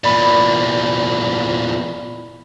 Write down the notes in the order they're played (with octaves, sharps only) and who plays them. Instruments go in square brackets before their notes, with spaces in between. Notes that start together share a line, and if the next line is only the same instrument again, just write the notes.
[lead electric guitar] E2 A#2 [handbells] D5 B5